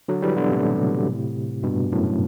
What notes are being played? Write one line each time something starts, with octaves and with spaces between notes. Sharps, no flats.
D3 F#3
E3 G3
B2 D3
A2 C3
G2 B2
F#2 A2